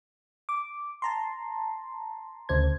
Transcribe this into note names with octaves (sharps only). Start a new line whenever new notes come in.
D6
A5 A#5 C6
D2 C#3 C5 G#6